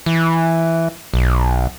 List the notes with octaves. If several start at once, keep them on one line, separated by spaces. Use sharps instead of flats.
E3
B1